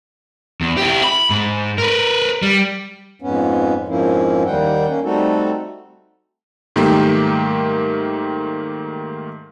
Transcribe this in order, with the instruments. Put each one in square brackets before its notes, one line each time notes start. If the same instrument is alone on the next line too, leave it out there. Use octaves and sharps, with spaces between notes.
[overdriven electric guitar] E2
E4 G4
B5
G#2
A#4 B4
G3
[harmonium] F2 G#2 B3 C#4
F2 G#2 F3 A#3 C#4 E4
D#2 D#3 G3 A#3 F#5 G5
A#3 C#4
G3 A3 C4 D#4 F#4 A4
[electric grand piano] G#2 D#3 G3 A3 A#3 G4